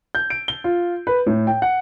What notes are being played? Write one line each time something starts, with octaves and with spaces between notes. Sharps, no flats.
G6
D7
G7
F4
B4
A2
G5
F#5